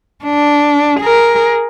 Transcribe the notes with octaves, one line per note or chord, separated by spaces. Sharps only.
D4
G#4 A#4